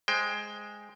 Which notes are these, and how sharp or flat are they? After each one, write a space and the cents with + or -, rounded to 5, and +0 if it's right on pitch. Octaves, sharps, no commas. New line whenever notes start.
G#3 +0 C5 +0 G5 +15